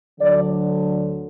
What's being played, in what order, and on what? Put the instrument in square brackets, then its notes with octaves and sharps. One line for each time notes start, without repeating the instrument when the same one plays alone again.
[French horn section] D2 D3 F#3 D5